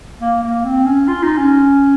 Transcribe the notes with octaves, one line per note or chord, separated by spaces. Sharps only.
A#3
A#3
C4
C#4
F4
D#4
C#4